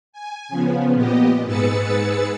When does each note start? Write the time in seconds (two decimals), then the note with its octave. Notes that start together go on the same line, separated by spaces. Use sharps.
0.13 G#5
0.49 C#3 F3 B3
0.94 A#2 B3 G4 D#5
1.44 G#2 G#4 B4 E6 A6 C#7